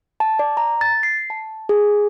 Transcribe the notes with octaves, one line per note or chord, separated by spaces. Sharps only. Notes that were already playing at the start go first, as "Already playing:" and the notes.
A5
D5
A#5
A6
C7
A5
G#4